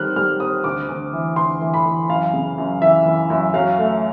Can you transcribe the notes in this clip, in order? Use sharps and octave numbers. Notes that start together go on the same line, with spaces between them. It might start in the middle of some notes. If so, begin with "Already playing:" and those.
Already playing: D#3 G3 C4 F6 F#6
G3 F6
C4 D#6
D2 D6
D2
E3
D2 C6
E3
B5
E3
F#2 F5
C#3
F#2
E3 E5
E3
F#2
F#3 F5
A3